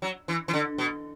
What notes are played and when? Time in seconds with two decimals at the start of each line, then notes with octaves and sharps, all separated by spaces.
0.02 F#3
0.28 E3
0.48 E3
0.53 D3
0.78 B2